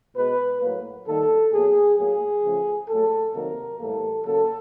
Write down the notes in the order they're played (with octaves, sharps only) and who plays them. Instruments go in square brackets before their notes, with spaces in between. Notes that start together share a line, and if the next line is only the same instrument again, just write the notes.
[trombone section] B2 G#3 B4
A2 F#3 A#3
D#3 G3 A#3 A4
B2 F#3 A#3 G#4
A2 F#3 A#3 G#4
C#3 F3 A3
A2 F#3 A3 A4
C3 D#3 F#3 A#3 A#4
A2 E3 G3 A#3 A4
C#3 F#3 A#3 A4